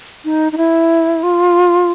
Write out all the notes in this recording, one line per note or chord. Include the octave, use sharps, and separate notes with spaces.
D#4
D#4
E4
F4